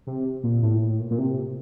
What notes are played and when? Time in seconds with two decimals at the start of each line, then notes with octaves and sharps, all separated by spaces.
0.07 C3
0.43 A#2
0.62 A2
0.82 A2
1.00 A#2
1.11 A#2
1.18 C3